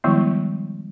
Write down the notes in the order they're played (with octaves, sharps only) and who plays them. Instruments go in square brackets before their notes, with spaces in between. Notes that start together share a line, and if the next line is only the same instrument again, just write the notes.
[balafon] D#3 F3 G3 G#3 B3 E4